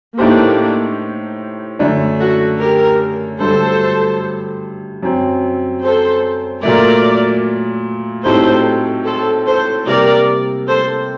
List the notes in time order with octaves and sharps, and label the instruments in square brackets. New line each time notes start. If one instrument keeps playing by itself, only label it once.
[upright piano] A2 A3 D#4 G4 C5 [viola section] A#3 D4
[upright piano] F#2 D3 A3 D4
[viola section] F#4 A4
G4 A#4
[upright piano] G2 D3 F#3 A3 [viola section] A4 C5
[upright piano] F#2 F#3 C4
[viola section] A4 C5
[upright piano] A#2 F#3 A3 [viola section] A#4 D5
[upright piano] A2 F#3 C4 D#4 G4 [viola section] A4 C5
[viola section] A4 C5
A4 C5
[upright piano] C3 G3 A#3 [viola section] A#4 D5
[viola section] A4 C5